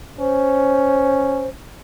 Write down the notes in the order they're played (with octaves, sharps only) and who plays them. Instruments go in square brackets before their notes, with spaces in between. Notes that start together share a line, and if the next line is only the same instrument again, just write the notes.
[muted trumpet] C#4 [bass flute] C5